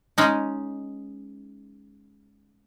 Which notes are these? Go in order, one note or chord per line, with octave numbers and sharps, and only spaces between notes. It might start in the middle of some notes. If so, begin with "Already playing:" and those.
G#3 C#4 D#4